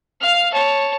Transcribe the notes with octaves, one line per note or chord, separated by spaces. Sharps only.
F5 F6
C#5 A5